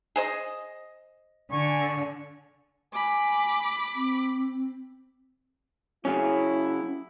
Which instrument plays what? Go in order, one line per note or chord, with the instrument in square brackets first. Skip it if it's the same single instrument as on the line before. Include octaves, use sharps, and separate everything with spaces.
[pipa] G#4 C5 D#5
[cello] D3 [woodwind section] G#5 C#6
[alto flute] G#5 [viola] B5 D6
[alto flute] C4
[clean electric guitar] C#3 F#3 C#4 [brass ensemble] E4